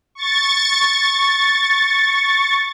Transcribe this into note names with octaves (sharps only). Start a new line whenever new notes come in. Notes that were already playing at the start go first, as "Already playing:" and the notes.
C#6 A6